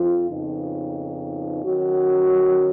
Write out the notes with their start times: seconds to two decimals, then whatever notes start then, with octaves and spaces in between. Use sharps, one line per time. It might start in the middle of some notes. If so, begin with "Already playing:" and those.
Already playing: F2 F3 F4
0.29 F2 C#3 F3 B3 D#4
1.64 D#3 F#3 C#4 F#4